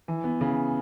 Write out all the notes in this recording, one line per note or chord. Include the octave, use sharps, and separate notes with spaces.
E3
B3
C#3